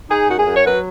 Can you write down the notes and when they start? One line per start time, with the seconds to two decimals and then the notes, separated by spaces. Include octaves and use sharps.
0.10 D#4 G#4
0.29 F#2 F#4
0.38 G#4
0.46 F#2
0.56 C#5
0.65 F#3 F#4 B4